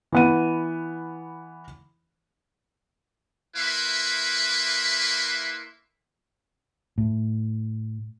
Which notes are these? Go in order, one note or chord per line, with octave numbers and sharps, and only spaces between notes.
E3 B3 D#7
A#3 E4 B4 E5 C6
A2